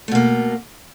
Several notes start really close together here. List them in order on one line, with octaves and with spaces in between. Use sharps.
A3 B2 A#3